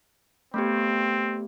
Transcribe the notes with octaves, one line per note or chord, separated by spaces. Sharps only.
A3 B3 C4 G4